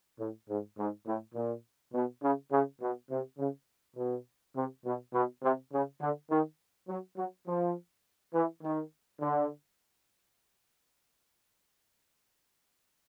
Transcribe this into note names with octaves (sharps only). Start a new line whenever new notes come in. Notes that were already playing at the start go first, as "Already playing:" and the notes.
A2
G#2
G#2
A2
A#2
B2
C#3
C#3
B2
C3
C#3
B2
C3
B2
B2
C3
C#3
D3
D#3
F#3
F#3
F3
E3
D#3
D3